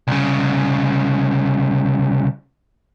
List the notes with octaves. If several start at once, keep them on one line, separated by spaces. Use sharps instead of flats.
C2 C#3